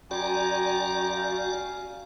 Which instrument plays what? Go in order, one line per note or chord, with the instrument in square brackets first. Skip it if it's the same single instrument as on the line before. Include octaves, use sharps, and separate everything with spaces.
[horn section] F#2 G5 A#5 [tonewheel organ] F#4 D5 [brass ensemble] G#5
[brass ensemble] F5 G#5